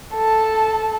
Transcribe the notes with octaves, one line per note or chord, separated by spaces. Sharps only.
A4 A5